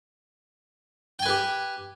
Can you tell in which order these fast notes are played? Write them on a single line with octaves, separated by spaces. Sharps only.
G5 G#5 B4 G4